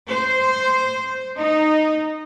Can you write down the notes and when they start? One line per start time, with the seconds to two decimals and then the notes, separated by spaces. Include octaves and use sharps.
0.10 C5
1.38 D#4